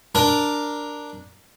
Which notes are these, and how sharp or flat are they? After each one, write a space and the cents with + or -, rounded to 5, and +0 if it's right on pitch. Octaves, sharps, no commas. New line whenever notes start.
D4 +0 A#4 +0